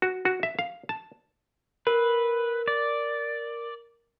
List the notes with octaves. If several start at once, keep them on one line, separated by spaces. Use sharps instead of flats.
F#4
F#4
E5
F5
A5
A#4 B4
D5